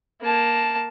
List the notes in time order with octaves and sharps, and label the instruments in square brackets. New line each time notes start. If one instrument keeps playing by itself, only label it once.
[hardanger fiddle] A#3 A5